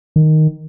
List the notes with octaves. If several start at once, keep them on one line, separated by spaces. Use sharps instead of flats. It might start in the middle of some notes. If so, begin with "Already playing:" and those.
D#3